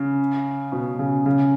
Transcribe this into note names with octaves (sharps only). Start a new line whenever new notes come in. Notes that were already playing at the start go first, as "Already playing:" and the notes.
Already playing: C#3
B2
C#3
C#3